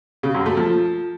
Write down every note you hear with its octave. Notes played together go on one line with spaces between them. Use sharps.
C#3
F#2
A3
F3